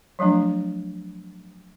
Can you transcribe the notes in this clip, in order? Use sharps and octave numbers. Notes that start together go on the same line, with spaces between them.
F3 F#3 A3 D4